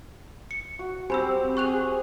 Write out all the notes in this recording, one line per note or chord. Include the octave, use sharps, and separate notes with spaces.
C#7
F#4
C4 G4 C5 G#5 B5 E6
G#4 C#6 F#6 F7